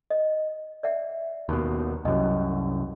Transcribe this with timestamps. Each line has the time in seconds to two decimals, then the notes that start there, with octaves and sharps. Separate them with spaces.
0.10 D#5
0.83 D5 E5 F#5
1.49 D#2 B2
2.05 C2 F#2 F#4 D#5